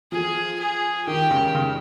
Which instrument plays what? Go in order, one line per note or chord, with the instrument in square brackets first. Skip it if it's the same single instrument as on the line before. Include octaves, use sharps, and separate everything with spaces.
[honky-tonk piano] F3 [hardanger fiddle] G#4
[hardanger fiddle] G#4
[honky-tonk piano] D#3 [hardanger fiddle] G4
[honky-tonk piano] C#3
C#3